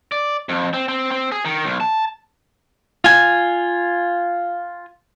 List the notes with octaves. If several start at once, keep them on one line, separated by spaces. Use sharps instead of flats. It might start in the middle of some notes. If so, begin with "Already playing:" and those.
D5
F2
C4
C4
C4
G#4
D#3
B1
A5
F4 G#5